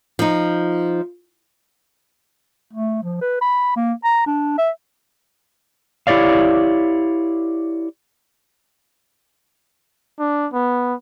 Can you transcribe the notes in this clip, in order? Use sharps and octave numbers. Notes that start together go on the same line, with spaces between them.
F3 D#4
A3
F3
B4
B5
A#3
A#5
D4
E5
E4 G4 C#5 D5 F5
D4
B3